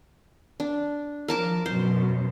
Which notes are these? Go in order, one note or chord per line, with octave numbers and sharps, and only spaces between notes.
D4
F3 A#4 A5 D6
F#2 B2 C5